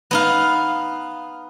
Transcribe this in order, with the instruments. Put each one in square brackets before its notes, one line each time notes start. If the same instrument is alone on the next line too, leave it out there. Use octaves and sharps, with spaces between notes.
[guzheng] B3 D#4 F5